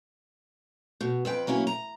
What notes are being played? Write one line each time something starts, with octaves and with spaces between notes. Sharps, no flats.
B2
F2 B4 G5
F#3 A#3 C#4 E4
A#5